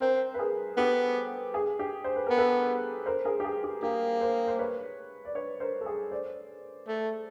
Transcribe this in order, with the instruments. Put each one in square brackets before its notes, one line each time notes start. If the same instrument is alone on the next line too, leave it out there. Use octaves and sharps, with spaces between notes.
[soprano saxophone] C4 [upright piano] A#4 C5
[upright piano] B4
G#4 A#4
[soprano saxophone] B3 [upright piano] G4 A4
[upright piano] G#4
G4
C5
B4
[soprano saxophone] B3 [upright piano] A#4
[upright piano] A4 B4
A#4 C5
G#4 A#4
G4
G#4
G4
[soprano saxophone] A#3 [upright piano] G4
[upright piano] A#4 C5
C5
B4 C#5
D5
B4 C#5
A#4 C5
A4
G#4
C5 D5
[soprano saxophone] A3